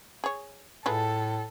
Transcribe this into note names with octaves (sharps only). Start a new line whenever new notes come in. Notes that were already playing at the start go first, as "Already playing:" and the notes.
G#4 C#5
A2 G#3 F4 A4 B4